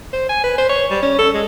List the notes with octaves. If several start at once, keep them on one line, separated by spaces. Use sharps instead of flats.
C5
G#5
B4
C5
C#5
G3
C#4
A4
G#3